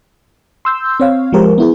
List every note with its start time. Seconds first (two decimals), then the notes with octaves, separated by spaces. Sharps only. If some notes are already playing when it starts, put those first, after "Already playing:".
0.65 C6 E6 G6
1.00 C4 C#5 F5
1.33 F3 G#3 G4 A#4 C5
1.58 B3 E4 G#4